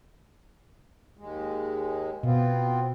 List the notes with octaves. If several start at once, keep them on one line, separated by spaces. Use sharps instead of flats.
D#2 G#3
B2 B3 C4 F4